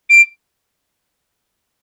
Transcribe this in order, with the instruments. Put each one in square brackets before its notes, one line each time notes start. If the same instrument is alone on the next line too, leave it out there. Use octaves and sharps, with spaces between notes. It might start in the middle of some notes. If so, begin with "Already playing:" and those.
[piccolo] D7